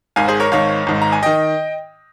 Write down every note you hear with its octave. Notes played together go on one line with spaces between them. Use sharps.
G#1 G#2 D#3 F5 G#5
G#4 C5
A#4 C#5
G#1 G#2 D#3 C#5 F5
G#1 G#2 D#3
A#5
G#5
D#3 D#5 G5